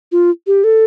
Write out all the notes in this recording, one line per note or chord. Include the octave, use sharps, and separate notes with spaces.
F4
G4
A4